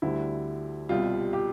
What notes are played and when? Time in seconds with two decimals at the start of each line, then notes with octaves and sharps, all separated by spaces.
0.02 D2 D3 G3 E4
0.89 C2 B2 G3 F4
1.33 G4